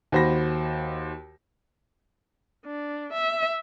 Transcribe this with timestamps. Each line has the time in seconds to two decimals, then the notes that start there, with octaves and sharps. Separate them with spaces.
0.12 D#2 F#4 C5 B5 A#6
2.66 D4
3.13 E5